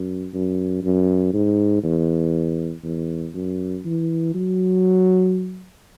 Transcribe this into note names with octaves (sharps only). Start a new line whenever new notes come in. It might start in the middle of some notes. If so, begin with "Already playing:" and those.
Already playing: F#2
F#2
F#2
G#2
E2
E2
F#2
E3
F#3